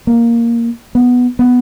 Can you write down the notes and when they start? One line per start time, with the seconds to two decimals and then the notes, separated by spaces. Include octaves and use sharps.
0.07 A#3
0.95 B3
1.39 B3